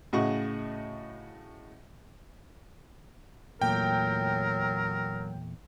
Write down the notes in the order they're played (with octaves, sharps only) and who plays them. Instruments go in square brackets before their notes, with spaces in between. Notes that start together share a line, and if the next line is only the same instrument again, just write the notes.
[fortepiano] A2 C#3 F#4 D#5 F#5 C#6
[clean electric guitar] E2 A#2 A3 [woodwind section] F#3 [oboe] A#4 [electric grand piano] G5